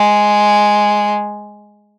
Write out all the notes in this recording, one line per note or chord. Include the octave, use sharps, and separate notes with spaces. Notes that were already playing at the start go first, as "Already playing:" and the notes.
Already playing: G#3